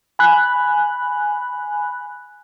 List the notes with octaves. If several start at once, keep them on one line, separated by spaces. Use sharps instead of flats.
G#5 B5 F#6